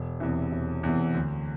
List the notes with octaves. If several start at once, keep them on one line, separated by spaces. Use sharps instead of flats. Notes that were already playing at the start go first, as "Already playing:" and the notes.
Already playing: E1
E2 C3 E3
E1
E2 C3 E3
D2